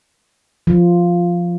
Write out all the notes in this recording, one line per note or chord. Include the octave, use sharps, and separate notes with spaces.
F3